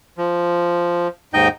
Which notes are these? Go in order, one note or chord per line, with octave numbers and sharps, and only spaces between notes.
F3
D#2 G#2 D#4 D#5 G5 G6